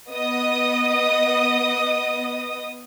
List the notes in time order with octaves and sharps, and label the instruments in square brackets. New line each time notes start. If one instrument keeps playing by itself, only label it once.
[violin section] B3 D#5 D#6